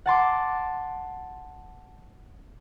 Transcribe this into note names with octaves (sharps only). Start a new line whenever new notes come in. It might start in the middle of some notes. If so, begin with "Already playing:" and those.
F#5 A5 C6 D6